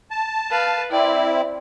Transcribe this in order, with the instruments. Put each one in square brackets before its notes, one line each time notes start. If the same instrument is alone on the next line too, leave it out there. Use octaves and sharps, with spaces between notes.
[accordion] A5
[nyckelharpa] B4 F5
[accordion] C4 E4 [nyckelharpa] D5